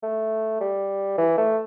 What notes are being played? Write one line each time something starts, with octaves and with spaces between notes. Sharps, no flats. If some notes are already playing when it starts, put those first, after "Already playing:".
A3
G3
E3
A3